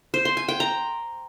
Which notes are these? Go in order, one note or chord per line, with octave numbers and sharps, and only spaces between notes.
C5
C6
G#5
G5
A#5